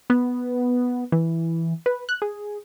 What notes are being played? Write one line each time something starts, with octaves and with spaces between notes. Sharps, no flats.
B3
E3
B4
F#6
G#4